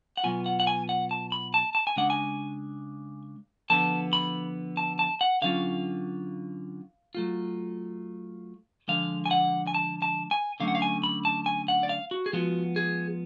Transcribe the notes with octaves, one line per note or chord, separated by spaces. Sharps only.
F#5
B2 F#3 B3 F4 G#5
F#5
F#5
G#5
F#5
A5
B5
A5
A5
G#5
C#3 G#3 D4 F#5
G#5
D3 F3 B3 A5
B5
A5
A5
F#5
D3 F#3 C#4 F4 F5
F#3 A3 F4
D3 F3 G#3 F5
G#5
F#5
G#5
A5
A5
G#5
D3 F#3 A3 C#4 F5
F#5
F5
G#5
B5
A5
G#5
F#5
D5
F5
F#4
G#4
F3 G#3 B3 F4 F#4
G#4